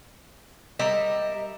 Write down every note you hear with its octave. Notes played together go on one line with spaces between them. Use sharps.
G3 A#4 D#5 E5